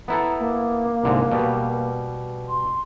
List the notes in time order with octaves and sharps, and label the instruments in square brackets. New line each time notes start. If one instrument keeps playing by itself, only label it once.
[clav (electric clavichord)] B3 E4 A4 [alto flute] A#5
[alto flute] A#3
[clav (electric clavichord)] C2 G#2 D3
B2 G3
[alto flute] C6